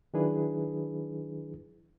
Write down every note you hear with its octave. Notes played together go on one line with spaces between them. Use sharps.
D#3 F#3 D4 E4 G#4 B4